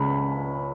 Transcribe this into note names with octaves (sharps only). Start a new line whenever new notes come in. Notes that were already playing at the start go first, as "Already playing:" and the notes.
Already playing: C#2 C#3 C#4 B5